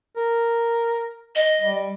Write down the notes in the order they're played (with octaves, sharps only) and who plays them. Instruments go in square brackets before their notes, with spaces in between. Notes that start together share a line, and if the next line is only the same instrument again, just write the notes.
[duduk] A#4
[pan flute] D#5
[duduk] G3